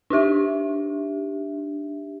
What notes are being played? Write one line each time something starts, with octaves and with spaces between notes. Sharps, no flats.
D4 D#4 G4 E5